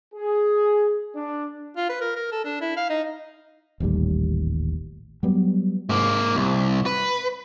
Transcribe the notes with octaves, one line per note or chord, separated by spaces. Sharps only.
G#4
D4
F4
B4
A#4
A#4
A4
D4
E4
F5
D#4
D#1 A1 D#2 G3
F#3 G3 B3
G#2 A#3
C2
B4